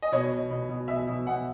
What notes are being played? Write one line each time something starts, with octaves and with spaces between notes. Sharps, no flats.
D#5
B2 C#5
B2
B2
B2
B2 E5
B2
B2 F#5